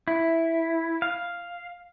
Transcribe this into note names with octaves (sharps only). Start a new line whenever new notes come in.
E4
F5